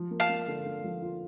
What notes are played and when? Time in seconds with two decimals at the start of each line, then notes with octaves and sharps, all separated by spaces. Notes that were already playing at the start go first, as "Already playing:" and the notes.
Already playing: F3
0.11 A#3
0.20 F5 A5
0.29 A#3
0.47 D3
0.65 D3
0.84 F3
1.02 F4